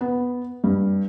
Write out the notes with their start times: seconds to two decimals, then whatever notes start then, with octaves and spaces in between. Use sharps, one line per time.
0.01 B3
0.64 G2